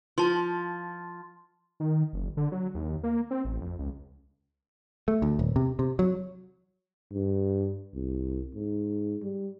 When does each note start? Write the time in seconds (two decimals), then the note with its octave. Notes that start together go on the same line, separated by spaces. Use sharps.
0.18 F3 A5 C6
1.80 D#3
2.13 F#1
2.37 D3
2.52 F#3
2.75 D#2
3.03 A#3
3.31 C4
3.45 A1
3.61 F2
3.79 C#2
5.08 A3
5.22 D2
5.39 D#1
5.56 C3
5.79 C3
5.99 F#3
7.13 G2
7.94 C2
8.55 G#2
9.22 G3